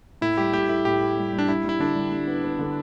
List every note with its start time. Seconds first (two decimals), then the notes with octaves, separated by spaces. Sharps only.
0.21 A2 E4
0.37 G3 G4
0.53 A2 G4
0.69 E4 A4
0.85 A2 G4
1.01 A4
1.17 G3
1.33 G3
1.38 D4
1.48 G3 E4
1.64 G3 E4
1.79 D3 D4
1.96 G3
2.12 G3
2.27 B3
2.44 B3
2.59 D3